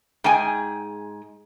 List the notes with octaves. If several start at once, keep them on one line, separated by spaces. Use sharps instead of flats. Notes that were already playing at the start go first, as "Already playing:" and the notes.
G#2 G#4 G5 G#5